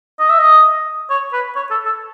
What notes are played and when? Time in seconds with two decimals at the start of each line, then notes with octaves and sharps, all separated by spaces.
0.20 D#5
0.29 E5
0.39 D#5
1.10 C#5
1.33 B4
1.56 C#5
1.71 A4
1.86 A4